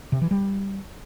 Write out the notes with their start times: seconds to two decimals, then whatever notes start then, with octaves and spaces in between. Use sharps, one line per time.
0.12 C3
0.21 E3
0.31 G3